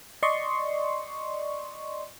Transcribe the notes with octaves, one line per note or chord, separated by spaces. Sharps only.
D5 D#5 C6 C#6